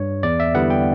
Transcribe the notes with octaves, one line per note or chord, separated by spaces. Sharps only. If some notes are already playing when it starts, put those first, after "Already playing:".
Already playing: G2 C#5
E2 D5
E5
D3 G3 B3 E4 F#5
G5